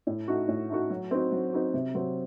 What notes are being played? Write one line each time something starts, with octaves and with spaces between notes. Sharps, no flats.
A2
A3 D#4 F#4
A2
A3 D#4 F#4
F#3
C4 D#4 F#4
F#3
C4 D#4 F#4
C3
F#3 C4